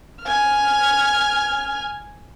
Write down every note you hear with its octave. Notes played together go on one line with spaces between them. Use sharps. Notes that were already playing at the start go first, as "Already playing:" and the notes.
G#5 F6